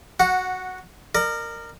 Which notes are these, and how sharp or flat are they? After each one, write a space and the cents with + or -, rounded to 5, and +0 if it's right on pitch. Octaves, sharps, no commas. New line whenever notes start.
F#4 +0 F#5 -15
A#4 -10 D5 +45